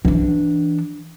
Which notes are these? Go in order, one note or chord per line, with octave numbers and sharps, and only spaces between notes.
E3 D4